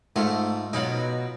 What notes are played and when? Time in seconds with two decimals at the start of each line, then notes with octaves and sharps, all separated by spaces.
0.16 G#2 A3 F4
0.73 B2 F#3 D#4 F4